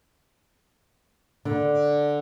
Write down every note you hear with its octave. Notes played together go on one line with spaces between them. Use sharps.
D3 D5